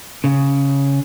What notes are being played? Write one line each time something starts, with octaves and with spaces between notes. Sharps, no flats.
C#3